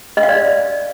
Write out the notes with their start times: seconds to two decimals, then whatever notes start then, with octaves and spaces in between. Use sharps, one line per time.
0.17 D#5
0.23 F5
0.29 D5